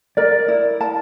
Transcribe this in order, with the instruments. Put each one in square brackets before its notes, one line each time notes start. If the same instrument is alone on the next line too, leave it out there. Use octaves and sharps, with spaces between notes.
[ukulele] A#4 [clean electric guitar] D5
[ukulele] E4
A5